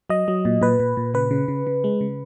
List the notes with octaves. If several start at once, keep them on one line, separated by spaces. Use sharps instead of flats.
F#3 D#5
F#3
A#2
A#2 B4
A#2
A#2
C#3 B4
C#3
C#3
C#3
G#3
C#3